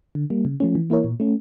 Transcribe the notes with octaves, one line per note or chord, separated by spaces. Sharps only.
D3
G3 A#3
C#3
F3 A3 C#4
E3
A#3 E4 A#4 C#5
A#2
A3 C#4